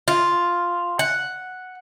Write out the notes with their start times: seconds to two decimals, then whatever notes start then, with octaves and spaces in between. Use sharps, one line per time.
0.08 F4
0.99 F#5